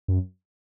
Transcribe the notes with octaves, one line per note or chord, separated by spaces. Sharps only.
F#2